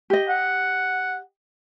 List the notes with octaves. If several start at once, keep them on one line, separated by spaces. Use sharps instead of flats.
G4 D#5
F#5